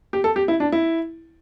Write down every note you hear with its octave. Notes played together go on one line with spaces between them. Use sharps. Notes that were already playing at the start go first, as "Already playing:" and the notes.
G4
A4
G4
E4
D4
E4